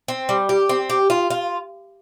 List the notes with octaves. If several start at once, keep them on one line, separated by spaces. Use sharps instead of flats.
C4
G3
G4
C4
G4
F4
F4